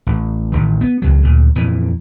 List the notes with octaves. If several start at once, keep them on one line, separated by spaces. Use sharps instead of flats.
A1
A1 D#3
B3
C#2 F#3
D2 A#2
F2 A#2 E3